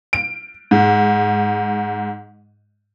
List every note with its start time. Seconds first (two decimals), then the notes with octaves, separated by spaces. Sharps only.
0.13 D7
0.71 G#2